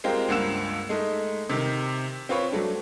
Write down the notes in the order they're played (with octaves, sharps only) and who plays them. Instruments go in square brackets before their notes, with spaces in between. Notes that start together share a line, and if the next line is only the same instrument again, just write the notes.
[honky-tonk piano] G#3 C4 F4 G4 A#4
C#2 G2 A#3 F#5 E6 E7
G#3 A3 D#4
C3 D#3
C4 F4 B4 C#5
F#3 A3 D4